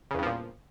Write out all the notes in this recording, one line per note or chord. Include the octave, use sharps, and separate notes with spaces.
E2 G2 A#2 C#3 F3